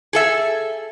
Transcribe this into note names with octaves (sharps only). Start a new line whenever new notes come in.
G#4 A4 E5